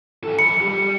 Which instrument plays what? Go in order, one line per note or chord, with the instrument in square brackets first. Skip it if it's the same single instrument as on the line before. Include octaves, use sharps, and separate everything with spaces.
[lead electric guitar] E3 A4
[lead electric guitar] F3 B5 [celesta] C#7
[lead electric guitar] G3 G4